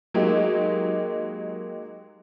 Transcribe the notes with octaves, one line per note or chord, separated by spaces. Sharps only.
F#3 G#3 A#3 D#4 G4